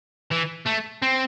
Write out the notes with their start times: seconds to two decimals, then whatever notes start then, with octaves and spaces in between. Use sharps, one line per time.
0.32 E3
0.67 A3
1.02 C4